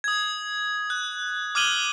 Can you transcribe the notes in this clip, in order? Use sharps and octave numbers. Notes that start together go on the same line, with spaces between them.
D#6 G#6
F#6
D6 F6 G#6 D#7 F#7 G7